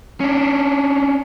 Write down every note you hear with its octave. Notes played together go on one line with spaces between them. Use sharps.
C#4 D4